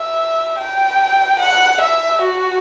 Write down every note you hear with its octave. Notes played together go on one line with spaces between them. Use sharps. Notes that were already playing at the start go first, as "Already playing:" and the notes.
Already playing: E5
G5
F#5
E5
F#4